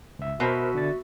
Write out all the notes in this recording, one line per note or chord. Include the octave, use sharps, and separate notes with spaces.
C#2 E5
B2 F#4 A#4 C5 E5 F6
D3 D5 A6